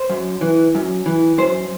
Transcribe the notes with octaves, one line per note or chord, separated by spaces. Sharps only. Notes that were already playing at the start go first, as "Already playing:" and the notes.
Already playing: C5
F#2
E3
F#2
E3
F#2 C5